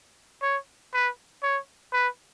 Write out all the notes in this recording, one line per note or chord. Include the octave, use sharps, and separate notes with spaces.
C#5
B4
C#5
B4